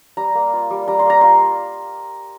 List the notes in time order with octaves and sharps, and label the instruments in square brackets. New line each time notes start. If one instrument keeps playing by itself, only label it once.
[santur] G3 A#5
A#3
F4
G3
G3 A#5
C6
A#3 A#5
F4 C6